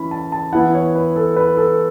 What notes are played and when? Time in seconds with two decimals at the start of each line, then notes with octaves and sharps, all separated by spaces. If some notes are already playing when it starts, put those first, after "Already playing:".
Already playing: E3 C#4 E4 B5
0.11 A5
0.32 A5
0.52 E3 B3 E4 F#5
0.75 C#5
0.95 B4
1.16 A4
1.36 B4
1.57 A4